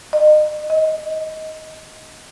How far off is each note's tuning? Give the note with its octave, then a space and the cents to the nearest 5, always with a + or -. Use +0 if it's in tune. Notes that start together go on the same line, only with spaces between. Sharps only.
D#5 -35
D#5 +15